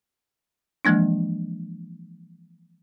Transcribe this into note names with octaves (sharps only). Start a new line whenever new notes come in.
E3 F3 G#3 A#3 D4